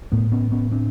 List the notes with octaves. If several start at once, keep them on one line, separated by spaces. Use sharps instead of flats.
A2 A3 B3
B3 C#4
B3 C#4
C4 D4